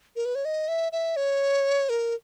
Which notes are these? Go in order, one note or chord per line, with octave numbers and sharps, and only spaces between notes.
A#4
B4
C#5
D#5
E5
E5
C#5
A#4